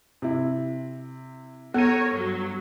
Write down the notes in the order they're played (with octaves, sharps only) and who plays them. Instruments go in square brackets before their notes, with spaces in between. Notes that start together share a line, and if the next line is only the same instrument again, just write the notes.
[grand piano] C3 E4
[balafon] B3 [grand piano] A4 D#7 [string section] A#4 C#5
[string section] G2 F#3